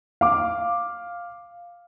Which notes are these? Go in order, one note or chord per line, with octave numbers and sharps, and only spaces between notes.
F5 D6